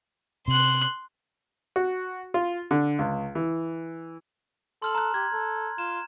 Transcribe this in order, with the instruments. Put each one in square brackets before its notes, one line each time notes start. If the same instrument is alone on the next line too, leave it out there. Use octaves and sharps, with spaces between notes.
[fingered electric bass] C3 [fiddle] C6 F#6
[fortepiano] F#4
F4
D3
C#2
E3
[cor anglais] A4 [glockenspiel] C6 F6 F#7
[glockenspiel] A#5 F#6
[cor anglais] G4 [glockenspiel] G#6
[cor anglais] A4
[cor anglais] F4 [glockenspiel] E7